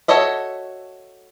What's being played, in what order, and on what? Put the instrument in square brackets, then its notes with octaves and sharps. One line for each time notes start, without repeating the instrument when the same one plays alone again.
[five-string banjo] F#4 A4 C#5 D#5 E5